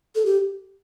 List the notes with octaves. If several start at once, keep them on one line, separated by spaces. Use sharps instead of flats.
A4
G4